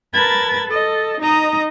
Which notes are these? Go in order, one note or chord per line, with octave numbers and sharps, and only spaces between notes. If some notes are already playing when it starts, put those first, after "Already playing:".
A#4 B4 A5 B5 G#6 A6
A4 D#5
D#4 D#5 A#5 D#6